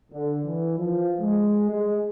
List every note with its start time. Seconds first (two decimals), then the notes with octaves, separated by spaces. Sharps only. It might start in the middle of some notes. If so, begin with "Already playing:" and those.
0.12 D3
0.45 E3
0.78 F3
1.21 G#3
1.71 G#3